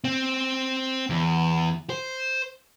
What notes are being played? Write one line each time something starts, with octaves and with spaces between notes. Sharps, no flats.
C4
E2
C5